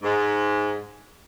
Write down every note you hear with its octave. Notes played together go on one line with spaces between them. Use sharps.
G#2